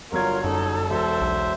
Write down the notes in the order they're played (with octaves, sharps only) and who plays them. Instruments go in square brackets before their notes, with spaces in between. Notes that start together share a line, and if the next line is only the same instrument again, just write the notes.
[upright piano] G1 F#3 G#6 [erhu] F4 [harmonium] A#4
[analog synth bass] F#2 [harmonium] D#4 [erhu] A4
[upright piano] E1 [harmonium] C5 E5
[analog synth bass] B1